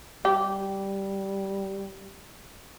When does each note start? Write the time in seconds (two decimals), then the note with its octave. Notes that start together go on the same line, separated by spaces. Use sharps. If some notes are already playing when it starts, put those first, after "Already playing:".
0.25 G3 G4